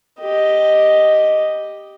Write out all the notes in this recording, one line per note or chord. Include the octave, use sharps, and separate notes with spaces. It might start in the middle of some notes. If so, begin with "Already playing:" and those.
G4 D#5